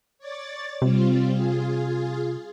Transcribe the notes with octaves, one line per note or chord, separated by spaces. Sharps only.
C#5 D5 A6
C3 G3 C4 F4
F4 G#4